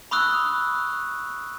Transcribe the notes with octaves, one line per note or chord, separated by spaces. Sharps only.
B5 C#6 D#6 E6 F#6